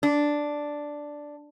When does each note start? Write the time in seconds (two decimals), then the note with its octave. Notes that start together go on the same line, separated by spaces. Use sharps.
0.03 D4